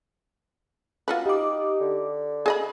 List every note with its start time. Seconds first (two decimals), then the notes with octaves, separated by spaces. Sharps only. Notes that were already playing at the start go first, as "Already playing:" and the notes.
1.08 F4 F#4 B4
1.26 D#4 G4 D6
1.80 D3
2.46 G#4 A4 D#5 B5